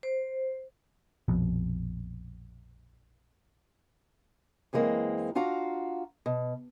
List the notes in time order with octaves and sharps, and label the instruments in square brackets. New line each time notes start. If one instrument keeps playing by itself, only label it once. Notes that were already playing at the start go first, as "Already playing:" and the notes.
[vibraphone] C5
[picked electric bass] A#1 F2 B2
[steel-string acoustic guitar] F#2 E3 G#3 A#3 C4
D4 F4 F#4 F5 A#5
B2